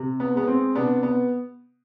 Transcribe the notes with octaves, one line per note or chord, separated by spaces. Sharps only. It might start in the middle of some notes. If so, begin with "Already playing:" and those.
Already playing: C3
B3
G#3 B3
C4
C3 B3 D4
B3